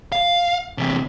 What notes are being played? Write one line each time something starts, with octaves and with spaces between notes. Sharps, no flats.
F5
E2 C3